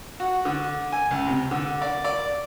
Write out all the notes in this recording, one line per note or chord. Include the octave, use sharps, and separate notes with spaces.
F#4
D3
G#5
C#2
C3
D3
D5
D5